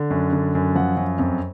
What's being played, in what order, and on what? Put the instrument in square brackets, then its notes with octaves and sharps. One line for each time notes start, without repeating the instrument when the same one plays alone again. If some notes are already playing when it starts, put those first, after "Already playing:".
Already playing: [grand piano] D3
F#2
D3
F#2
F3 F#5
F#2
F2